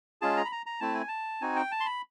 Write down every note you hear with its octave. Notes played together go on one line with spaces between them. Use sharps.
G#3 C#4 F4 G#4 A5
A#5
B5
A#5
A#5
A3 C4 E4 A5
G#5
A5
C4 D#4 F#4 G#5
G5
A5
C6
B5